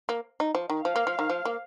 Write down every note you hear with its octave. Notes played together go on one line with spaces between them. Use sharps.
A#3
D#4
F3
D#3
F3 F5
A#3
F3
D#3
F3
A#3